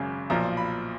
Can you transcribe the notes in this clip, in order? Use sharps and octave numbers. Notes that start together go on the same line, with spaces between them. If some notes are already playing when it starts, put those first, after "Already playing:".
Already playing: G#1 F#2 C#3
B1 A#2 F3 A#5
B5